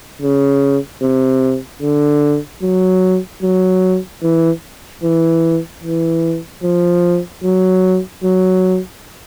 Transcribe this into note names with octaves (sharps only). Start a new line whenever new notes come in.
C#3
C3
D3
F#3
F#3
E3
E3
E3
F3
F#3
F#3